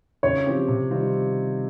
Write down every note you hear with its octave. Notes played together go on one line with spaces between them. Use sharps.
C#3 C#5
F3 C4 G4
C3
D#3 G3 C4 F4